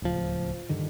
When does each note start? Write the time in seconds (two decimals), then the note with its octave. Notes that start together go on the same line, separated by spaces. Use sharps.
0.02 D1 C#2 D3 F3
0.69 G2 D3 D#3